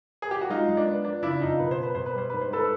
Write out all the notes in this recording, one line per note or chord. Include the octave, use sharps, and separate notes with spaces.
G#4
G4
F#4
G#3 D#4 F4
G#3
D4
B3
F3 D4
C#3 D4 E4
F2 D#4 F4
B2 B4
C5
B3
B4
B2 C5
B4
G3 C5
G#2 B4
C5
G#2 A4 B4